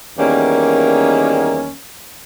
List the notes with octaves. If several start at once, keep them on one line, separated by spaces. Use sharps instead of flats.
E2 D#3 G3 A#3 C#4